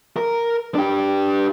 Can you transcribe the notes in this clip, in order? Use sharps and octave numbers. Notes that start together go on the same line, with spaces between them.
A#4
D4 G4